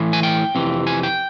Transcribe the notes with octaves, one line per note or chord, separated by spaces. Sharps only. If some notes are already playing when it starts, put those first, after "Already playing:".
Already playing: A2 E3
G#5
G5
F2 C3 E3
G#5
G5